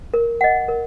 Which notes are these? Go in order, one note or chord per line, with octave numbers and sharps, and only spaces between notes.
A#4
D#5 F#5
A#4